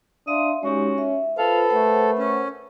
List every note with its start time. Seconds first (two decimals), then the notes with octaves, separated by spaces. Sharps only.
0.28 D4 E5 F5 C6 D#6
0.63 G#3 C#4 D#4 F#4 G4
0.98 E5
1.38 F4 A4 B4 C5 F5
1.70 A3 A#4 C5 F#5
2.18 C#4